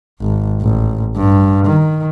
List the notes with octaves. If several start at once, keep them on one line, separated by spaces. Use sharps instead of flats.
G#1
A1
G2
D#3